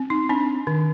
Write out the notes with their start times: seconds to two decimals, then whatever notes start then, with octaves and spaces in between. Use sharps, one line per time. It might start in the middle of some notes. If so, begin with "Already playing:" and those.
Already playing: C4
0.10 D#4
0.29 C4 D4
0.67 D#3